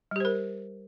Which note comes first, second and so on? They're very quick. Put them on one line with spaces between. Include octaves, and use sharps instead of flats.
G3 G4 C5 A#4